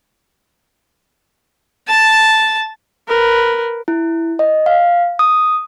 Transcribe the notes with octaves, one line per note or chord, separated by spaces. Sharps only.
A5
A#4 B4
E4
D#5
F5
D#6